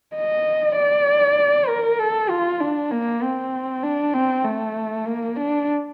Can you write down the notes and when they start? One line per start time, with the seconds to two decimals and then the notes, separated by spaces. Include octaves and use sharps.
0.16 D#5
0.76 D5
1.68 A#4
1.99 A4
2.30 F4
2.61 D4
2.91 A#3
3.22 C4
3.83 D4
4.14 C4
4.44 A3
5.06 A#3
5.36 D4